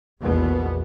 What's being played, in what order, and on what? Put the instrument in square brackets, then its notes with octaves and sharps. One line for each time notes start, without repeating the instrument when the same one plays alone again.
[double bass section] A#1 E2 B2 B3